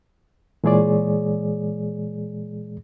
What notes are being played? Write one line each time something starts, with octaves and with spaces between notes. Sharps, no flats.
A#2 E3 G#3 G#4 C#5 D5